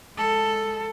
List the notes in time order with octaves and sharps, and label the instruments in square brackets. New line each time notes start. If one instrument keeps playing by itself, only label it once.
[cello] G#3 A4